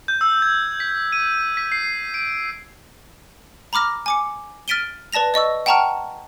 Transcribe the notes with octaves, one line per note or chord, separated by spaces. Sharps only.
G6
E6
G#6
B6
D#7
B6
C7
D7
A#5 B5 D6 F6 A#6
G#5 D6 C#7
F6 A6 B6 D7 D#7 G7
B4 D5 A5 A#6 F7
D5 D#5 C#6 E6
F#5 G5 A5 A#5 C#6 F6